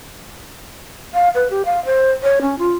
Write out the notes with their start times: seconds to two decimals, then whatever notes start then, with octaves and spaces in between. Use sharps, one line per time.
1.14 F5
1.35 B4
1.50 G4
1.65 F5
1.85 C5
2.23 C#5
2.42 C#4
2.58 F4